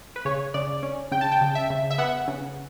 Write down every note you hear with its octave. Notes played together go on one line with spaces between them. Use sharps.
B4
C#3 C#5
C#3 D5
C#4
C#3 G5
A5
G5
C#3
E5
C#3
E5
B3 F#5
C#3